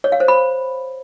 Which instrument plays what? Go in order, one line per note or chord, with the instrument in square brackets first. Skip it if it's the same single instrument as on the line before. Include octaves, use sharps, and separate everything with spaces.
[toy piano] C#5
F5
C5
B5